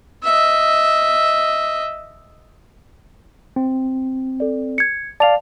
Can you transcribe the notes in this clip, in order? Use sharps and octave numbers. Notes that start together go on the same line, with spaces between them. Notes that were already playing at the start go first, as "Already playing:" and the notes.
D#5 E5
C4
A4 D5
G#6 C#7
D5 F5 A5 F7